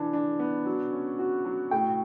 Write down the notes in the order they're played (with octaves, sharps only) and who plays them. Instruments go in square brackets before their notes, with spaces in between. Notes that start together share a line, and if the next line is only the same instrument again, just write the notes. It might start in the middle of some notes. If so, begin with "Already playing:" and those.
Already playing: [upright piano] E3 D4 [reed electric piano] A5
[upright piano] D4
B3
F#3
C#4
F#4
F#3
[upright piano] A2 [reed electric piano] G5